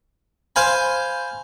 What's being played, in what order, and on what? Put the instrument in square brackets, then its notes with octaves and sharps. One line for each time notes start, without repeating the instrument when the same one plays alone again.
[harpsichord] C5 F5 G#5 B5